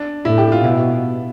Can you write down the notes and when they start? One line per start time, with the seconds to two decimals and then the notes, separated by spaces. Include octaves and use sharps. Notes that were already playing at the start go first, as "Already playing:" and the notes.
Already playing: D4
0.25 A2 E4
0.38 G4
0.52 F4
0.64 B2 E4